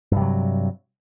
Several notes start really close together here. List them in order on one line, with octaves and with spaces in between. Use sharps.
G2 C3 F#3